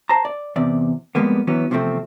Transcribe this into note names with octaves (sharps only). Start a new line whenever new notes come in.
C5 A5 A#5
D5
E2 C3 D5
F2 D3 G3 G#3 A#3 B3
E3 F#3 B3 C#4
E2 C3 F3 G3 A3 C4